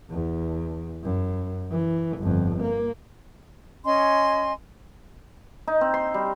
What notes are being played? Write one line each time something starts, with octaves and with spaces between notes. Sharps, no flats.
E2
F#2
E3
G1 F2
A#3
C#4 D#5 G#5 C6
D#4
C4
C6
G3